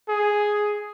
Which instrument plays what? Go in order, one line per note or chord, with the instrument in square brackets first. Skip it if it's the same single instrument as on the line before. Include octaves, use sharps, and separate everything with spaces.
[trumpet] G#4